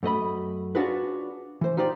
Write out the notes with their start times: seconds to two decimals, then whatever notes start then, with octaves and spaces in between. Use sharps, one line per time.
0.03 F#2 A3 D#5 B5
0.75 C#4 D4 F4 F#4 G#4 B4
1.61 E3 C5
1.77 D#4 F4 G4 C5 D5